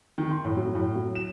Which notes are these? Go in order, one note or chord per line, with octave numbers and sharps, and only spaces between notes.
D#3
C6
A2
F#3
A2
F#3
E7